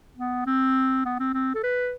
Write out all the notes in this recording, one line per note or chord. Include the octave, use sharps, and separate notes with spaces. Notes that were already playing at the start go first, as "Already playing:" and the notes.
B3
C4
B3
C4
C4
A4
B4